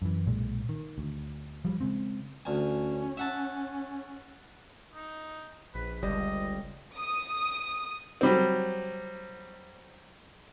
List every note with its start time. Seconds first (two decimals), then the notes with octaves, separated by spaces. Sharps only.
0.02 F#2 E3
0.26 B1 A#2 G#3
0.69 D#3
0.98 D2
1.65 F3 G3
1.81 C#3 G#3 C4
2.45 D2 C#4 G#5
3.17 E5 F#5 A5
4.95 D#4
5.74 A#1 B4
6.03 G1 C#2 G3 D#5
6.97 D#6
8.21 F#3 G3 C4